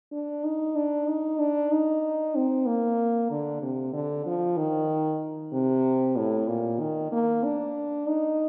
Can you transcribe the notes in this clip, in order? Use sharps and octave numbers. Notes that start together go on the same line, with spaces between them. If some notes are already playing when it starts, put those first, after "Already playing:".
D4
D#4
D4
D#4
D4
D#4
C4
A#3
D3
C3
D3
F3
D#3
C3
A2
A#2
D#3
A#3
D4
D#4